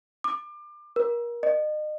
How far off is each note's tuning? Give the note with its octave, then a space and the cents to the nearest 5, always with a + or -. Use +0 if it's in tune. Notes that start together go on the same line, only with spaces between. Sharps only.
D6 +30
A#4 +30
D#5 -35